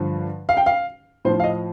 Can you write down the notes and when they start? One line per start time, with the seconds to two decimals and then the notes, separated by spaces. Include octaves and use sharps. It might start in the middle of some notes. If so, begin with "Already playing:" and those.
Already playing: G2 D3 F3
0.49 F5
0.57 G5
0.66 F5
1.25 A2 F3 C5
1.40 F5
1.44 D#5